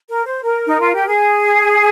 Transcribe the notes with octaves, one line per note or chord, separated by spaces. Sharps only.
A#4
C5
A#4
D#4
F4
G4
G#4